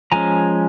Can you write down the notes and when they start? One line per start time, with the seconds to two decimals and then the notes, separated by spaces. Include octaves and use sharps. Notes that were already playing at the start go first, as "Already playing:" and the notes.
0.12 F3 G#3 C#4 G#5 A#5